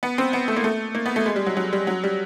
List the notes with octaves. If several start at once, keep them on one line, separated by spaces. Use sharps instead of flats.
B3
C4
B3
A3
A#3
A3
A#3
B3
A3
G#3
G3
F#3
F#3
G3
F#3
G3